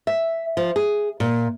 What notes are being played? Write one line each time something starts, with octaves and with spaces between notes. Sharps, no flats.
E5
F3
G#4
A#2